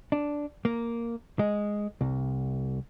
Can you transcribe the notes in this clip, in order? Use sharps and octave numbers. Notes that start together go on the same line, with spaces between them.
D4
A#3
G#3
C2